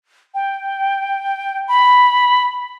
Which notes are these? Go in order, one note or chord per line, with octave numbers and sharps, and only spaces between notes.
G5
B5